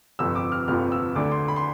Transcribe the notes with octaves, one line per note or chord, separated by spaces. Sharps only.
G1 F2 C3 F3 E6
D6
F6
G1 F2 C3 F3 F6
E6
D2 D3 A3 D4 D6
C6
B5
C6